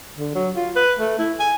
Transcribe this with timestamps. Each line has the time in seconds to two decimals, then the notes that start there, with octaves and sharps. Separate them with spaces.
0.17 D3
0.35 F#3
0.56 F4
0.76 B4
0.99 A3
1.19 E4
1.39 G#5